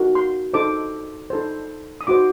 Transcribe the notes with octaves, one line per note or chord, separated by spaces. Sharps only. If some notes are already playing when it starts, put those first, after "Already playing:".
Already playing: D#4 F#4 A#4
C6
D#4 A4 C5 D6
D#4 A4 C5
D#6
D#4 F#4 C5 D6